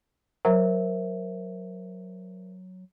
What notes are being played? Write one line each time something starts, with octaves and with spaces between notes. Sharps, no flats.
F#3 A#4 C5 E5